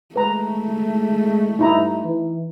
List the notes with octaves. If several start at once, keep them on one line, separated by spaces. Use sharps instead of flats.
G#3 A3 B4 A#5
G2 D#4 E4 A#5
E3